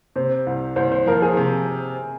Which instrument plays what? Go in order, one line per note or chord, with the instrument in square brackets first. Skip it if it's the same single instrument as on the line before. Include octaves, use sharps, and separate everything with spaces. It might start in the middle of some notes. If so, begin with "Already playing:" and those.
[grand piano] C3 [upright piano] C5
[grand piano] C2
[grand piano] C2 [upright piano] C5
[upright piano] C5
[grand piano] F3 [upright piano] A#4
[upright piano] G#4
[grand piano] C3